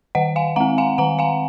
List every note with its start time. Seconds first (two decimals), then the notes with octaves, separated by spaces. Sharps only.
0.15 D#3 D#5 F#5
0.36 F5 G#5
0.56 G#3 C4 F#5 A#5
0.78 F5 G#5
0.98 D#3 F#5 A#5
1.19 F5 G#5